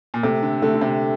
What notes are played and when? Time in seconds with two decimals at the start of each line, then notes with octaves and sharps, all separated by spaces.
0.14 A#2
0.23 C3 A3
0.42 D3
0.62 D3 A3
0.74 D3
0.81 C3